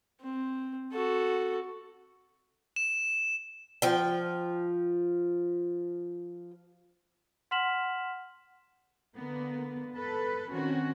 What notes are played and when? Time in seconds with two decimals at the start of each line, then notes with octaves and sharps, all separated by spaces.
0.21 C4
0.93 F#4 A4
2.76 E7
3.82 F3 G5
7.51 F#5 C6 F6 B6 E7 F#7
9.17 D3 A#3 B3
9.95 A4 B4
10.51 D#3 C4 C#4 F#4